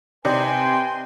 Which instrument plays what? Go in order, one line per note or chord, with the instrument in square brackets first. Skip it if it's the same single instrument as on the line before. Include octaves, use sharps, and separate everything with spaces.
[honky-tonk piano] C3 [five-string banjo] D#4 D5 [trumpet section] B4 G5 [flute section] G#5 C6